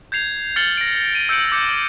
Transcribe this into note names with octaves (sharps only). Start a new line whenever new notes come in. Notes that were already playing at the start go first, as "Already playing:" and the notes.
G6 G#6 C7 F7
F6 A6 C7 C#7 F#7 G7
A#6 D7
D#7
E6 G6 C#7 D7 F#7
D6 G6 A#6 C#7